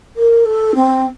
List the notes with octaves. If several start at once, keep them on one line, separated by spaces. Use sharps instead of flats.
A#4
A4
C4